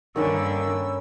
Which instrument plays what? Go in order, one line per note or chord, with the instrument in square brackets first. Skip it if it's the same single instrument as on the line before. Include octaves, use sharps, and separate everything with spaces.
[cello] G2 D3 [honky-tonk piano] D#3 [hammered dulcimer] A#3 C#4 B4 [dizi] E6